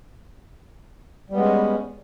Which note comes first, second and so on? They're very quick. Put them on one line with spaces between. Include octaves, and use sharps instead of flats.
G3 B3 G#3 C#4